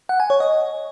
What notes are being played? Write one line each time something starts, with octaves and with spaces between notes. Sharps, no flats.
F#5
G#5
C#5
D#5